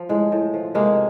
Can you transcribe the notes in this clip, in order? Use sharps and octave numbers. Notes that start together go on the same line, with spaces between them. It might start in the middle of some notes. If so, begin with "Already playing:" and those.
Already playing: F3
A2 G#3
A2
F3
C3 G#3 A#3